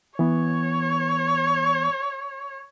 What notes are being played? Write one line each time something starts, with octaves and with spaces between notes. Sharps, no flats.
E3 B3 C#5